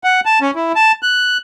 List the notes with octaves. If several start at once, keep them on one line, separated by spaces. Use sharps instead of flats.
F#5
A5
C#4
E4
A5
F#6